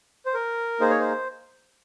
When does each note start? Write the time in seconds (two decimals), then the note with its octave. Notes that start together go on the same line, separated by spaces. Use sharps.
0.26 C5
0.34 A#4
0.80 A#3 D#4 G#4 C5
0.90 C#5
1.00 C5